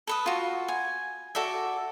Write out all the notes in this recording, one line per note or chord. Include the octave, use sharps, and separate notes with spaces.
A4 B4 D#6
F4 F#4
G#5
F#4 A4 D5 E5